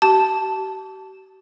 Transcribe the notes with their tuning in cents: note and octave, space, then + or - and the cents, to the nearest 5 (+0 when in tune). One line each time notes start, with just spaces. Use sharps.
G4 -45 A5 +0